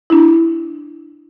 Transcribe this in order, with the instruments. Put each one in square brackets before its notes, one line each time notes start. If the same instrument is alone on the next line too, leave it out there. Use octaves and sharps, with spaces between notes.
[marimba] D4 E4